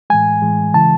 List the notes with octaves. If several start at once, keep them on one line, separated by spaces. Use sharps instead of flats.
A2 E3 G#3 G#5
A2 E3 G#3
C#3 E3 G#3 A5